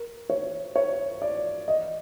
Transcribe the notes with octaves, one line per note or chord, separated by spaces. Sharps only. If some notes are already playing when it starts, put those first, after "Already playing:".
Already playing: A#4
C#5
C#5
D5
D#5